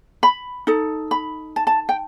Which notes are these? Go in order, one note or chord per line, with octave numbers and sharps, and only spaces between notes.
B5
D#4 A4
B5
A5
A5
G5